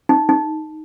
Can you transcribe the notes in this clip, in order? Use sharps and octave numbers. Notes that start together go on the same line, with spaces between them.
D#4
D#4